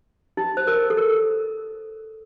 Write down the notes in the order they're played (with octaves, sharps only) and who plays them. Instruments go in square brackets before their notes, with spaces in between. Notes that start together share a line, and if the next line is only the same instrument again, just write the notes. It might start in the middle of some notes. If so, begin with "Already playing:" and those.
[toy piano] D#4
C5
A#4
A4
A#4